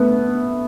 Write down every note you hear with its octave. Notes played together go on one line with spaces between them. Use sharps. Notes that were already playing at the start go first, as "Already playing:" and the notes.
Already playing: A3 B3